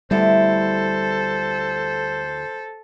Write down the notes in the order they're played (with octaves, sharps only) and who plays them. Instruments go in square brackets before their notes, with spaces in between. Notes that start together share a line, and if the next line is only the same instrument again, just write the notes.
[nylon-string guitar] D2 B3 E4 [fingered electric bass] G3 [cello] A4 [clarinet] C5